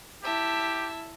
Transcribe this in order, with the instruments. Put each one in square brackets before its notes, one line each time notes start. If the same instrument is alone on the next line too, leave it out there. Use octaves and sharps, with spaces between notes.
[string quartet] E4 E5 A5 [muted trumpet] G4